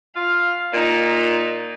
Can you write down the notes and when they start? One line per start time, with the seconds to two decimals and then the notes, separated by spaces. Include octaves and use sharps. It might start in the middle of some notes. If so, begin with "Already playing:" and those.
0.16 F4 F5
0.73 A#2 D#4